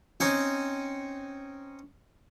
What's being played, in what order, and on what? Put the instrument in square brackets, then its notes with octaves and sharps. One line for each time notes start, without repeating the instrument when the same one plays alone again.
[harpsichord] C4 C#4 D#4 C#5